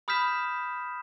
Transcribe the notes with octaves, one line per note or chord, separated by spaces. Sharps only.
B5 D#6 F6 G6 B6 E7